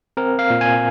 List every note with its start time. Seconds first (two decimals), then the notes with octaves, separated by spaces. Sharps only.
0.17 C4 A#4
0.39 F5
0.50 A#2
0.61 G#5